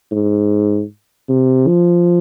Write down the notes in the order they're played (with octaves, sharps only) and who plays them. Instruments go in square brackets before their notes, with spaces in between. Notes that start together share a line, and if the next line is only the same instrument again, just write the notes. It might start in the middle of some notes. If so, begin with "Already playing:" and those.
[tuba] G#2
C3
F3